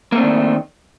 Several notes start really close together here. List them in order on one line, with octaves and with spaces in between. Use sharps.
A#3 A3 C4 D4 D#3